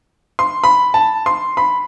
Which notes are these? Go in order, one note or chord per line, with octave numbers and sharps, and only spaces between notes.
C6
B5
A5
C6
B5